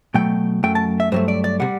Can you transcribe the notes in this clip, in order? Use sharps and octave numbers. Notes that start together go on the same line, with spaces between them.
B2 F#3 A3 G5
F#2 F#3 A3 G5
A5
E5
G2 F#3 A3 C5
D5
D5
C3 G3 F#5